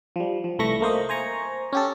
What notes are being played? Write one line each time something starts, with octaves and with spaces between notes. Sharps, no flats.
F3 G3
F3
C2 E3 A3 B5 C#6 A#6
A3 A#3 C5 D#5
C5 G#5 A#5 C#6
C#4 G4 A4